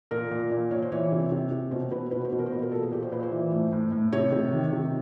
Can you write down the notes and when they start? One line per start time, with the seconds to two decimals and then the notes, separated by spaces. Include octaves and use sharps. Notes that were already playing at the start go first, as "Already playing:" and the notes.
0.11 A#2 A#4
0.31 A#2
0.51 A#2
0.71 A#2 C#5
0.82 C5
0.92 E3 C#5
1.12 C3
1.32 C3
1.52 C3
1.71 B2 C5
1.92 B2 B4
2.11 B2 B4
2.25 C5
2.32 B2
2.39 A#4
2.46 C5
2.51 A#2 B4
2.62 A#4
2.72 A#2 A4
2.83 G#4
2.91 A#2 G4
3.02 C5
3.12 A#2 B4
3.23 C5
3.32 E3
3.52 A2
3.72 A2
3.92 A2
4.12 C3 C#5
4.32 C3
4.52 D#3
4.73 C3